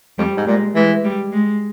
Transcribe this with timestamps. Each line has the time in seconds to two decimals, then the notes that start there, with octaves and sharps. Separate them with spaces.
0.18 F2 G3
0.37 G#2
0.47 A#2 G#3
0.75 E3 G#3
1.04 G3
1.32 G#3